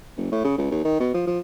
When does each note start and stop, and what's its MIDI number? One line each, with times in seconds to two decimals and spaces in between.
0.17 0.30 30
0.32 0.43 45
0.44 0.56 49
0.58 0.71 37
0.71 0.80 39
0.85 0.99 51
1.00 1.10 47
1.14 1.22 53
1.27 1.39 53